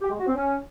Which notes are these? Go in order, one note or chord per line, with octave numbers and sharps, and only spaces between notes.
G4
G#3
F#4
C4
C#4